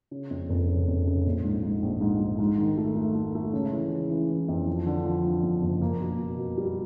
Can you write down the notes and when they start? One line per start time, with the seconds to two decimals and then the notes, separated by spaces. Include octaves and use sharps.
0.11 C#3
0.31 F2
0.50 F1
0.68 C#3
0.88 F1
1.07 C#3
1.26 A#1
1.44 G#2
1.63 G#2
1.82 A#1
2.01 G#2
2.20 G#2
2.39 G#2
2.58 D#3
2.77 A3
2.96 A3
3.15 A3
3.35 A3
3.53 C#3
3.72 E3
3.91 C#3
4.10 E3
4.29 E3
4.48 F2
4.67 F3
4.86 D3
5.05 F3
5.25 F3
5.43 F2
5.62 F#1
5.82 A#3
6.00 B2
6.19 B2
6.38 B2
6.57 G3